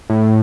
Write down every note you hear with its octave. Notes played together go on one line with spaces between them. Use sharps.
A2